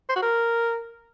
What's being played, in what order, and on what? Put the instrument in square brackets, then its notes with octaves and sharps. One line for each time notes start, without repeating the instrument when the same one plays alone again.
[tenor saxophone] C5
F#4
A#4